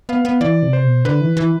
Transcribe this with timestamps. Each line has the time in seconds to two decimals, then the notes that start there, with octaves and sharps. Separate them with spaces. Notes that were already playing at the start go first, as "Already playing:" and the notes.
0.09 B3 F5
0.25 B3
0.41 E3 D5
0.63 C3
0.73 C5
0.84 B2
1.05 D3 B4
1.21 E3
1.37 E3